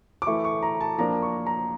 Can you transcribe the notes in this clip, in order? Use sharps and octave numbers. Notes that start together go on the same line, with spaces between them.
D6
E3 A3 E4 C#6
C#6
A#5
A5
F3 A#3 D4 A#5
C#6
A#5